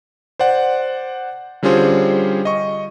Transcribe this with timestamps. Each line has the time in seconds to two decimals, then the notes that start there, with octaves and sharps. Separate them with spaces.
0.39 C5 D5 F#5
1.63 D3 G3 C#4 F4 G#4 C5
2.45 D#5 C#6